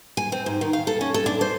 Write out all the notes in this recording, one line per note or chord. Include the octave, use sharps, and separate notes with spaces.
G#5
C4
G#2
D#3
F5
A4
C#4
A4
D4
C5